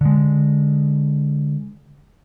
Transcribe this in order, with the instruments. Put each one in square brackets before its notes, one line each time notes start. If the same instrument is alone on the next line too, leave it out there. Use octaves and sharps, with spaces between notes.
[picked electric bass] D3 G#3